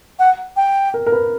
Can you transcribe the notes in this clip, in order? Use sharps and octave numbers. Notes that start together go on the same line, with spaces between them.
F#5
G5
A#4
A#4
B4